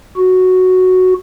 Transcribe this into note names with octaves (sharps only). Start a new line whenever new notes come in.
F#4